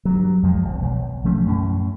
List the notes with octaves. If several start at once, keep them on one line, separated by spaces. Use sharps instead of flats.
G2 F#3
F2 F3 G3 G#3
G#1
B1
F3 A3 C#4
F#2 A2 C#4